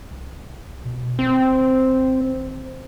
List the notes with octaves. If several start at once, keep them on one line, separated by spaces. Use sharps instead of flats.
C2
B2
G#1 C4